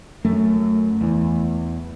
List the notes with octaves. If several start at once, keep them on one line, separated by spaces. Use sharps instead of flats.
F#2 A3
E2 E3